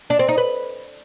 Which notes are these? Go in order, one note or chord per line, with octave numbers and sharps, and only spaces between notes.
D4
C4
D#4
B4